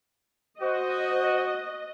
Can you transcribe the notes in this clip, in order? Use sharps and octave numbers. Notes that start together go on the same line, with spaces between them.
F#4 C5 D#5